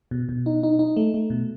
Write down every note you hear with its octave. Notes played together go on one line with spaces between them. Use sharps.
B2
B2
D#4
D#4
D#4
A3
A3
B2